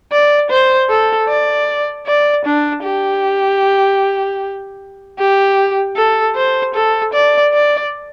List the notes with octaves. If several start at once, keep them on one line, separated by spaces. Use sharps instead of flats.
D5
C5
A4
D5
D5
D4
G4
G4
A4
C5
A4
D5
D5